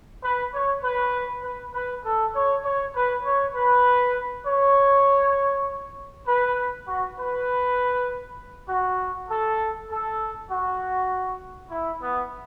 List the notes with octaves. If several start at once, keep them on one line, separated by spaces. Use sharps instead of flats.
B4
C#5
B4
B4
B4
A4
C#5
C#5
B4
C#5
B4
C#5
B4
F#4
B4
F#4
A4
A4
F#4
E4
B3